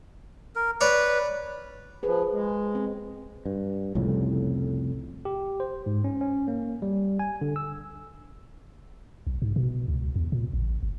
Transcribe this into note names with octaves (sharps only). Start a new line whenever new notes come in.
A#4
B4 C#5 D5
F3 G#4 B4
G#3
C4
G2
C2 F2 A2 C#3
G4
C5
G#2
C#4
C#4
A#3
G3
G#5
D3
E6
B1
G#2
B2
C#2
E2
A#2
A1
G1